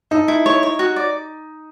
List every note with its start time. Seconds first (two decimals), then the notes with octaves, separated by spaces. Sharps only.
0.11 D#4 A4
0.28 E4
0.46 C#5
0.63 C#5
0.79 F#4
0.96 D5